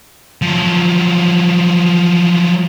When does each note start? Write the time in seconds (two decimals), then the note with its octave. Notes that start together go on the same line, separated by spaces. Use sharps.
0.42 F3 F#3